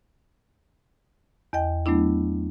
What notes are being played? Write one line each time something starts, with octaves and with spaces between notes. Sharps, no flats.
E2 D#5 G5
F#3 A3 B3 D4 E4